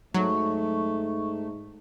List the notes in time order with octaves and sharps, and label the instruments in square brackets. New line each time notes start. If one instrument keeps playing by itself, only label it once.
[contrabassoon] G#2 [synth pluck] F#3 [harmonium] A3 [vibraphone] C#6